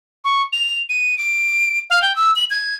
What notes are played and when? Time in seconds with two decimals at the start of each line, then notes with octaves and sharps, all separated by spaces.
0.24 C#6
0.53 F7
0.89 D#7
1.18 D7
1.90 F5
2.02 G5
2.16 E6
2.36 F#7
2.50 G#6